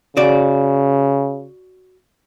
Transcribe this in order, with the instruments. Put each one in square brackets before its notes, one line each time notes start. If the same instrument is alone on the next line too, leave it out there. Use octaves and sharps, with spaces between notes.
[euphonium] C#3 [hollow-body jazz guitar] F#4 D5